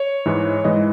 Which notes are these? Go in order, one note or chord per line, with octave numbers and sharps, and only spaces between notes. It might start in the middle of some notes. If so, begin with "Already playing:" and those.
Already playing: C#5
G#2 E3 G#3
G#2 E3 G#3 D#5